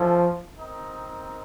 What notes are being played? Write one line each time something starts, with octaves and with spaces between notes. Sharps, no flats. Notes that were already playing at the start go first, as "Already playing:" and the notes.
Already playing: F3 A3 C#4 A4
C4 D#4 A#4 D#5